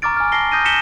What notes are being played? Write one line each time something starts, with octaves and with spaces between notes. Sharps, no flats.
A#5 C#6 D6 F6 A6 D7
G#5 F6
A5 F6 A#6 C7 G7
D#6 G6 A#6 D#7
A#6 B6 C#7 E7 G7